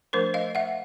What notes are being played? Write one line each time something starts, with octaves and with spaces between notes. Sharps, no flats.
F3 A3 D4 A#4 C5
D#5 F5
E5 F#5